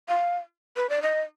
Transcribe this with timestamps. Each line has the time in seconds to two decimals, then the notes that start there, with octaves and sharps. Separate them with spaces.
0.08 F5
0.76 B4
0.89 D5
1.02 D#5